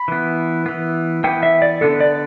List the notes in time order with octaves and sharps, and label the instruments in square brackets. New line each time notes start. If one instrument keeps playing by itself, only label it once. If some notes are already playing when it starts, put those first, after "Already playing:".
Already playing: [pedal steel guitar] B5
E3 B3
E3 B3
E3 B3 G5
E5
D5
D3 B3 A4
D5